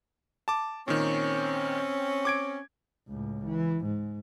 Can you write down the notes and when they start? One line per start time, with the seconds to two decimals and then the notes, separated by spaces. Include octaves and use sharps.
0.48 A5 D6
0.88 A#2 D#3 C4 C#4
2.25 D6 G#6 D7
3.08 C#2 A2
3.44 E3
3.85 G#2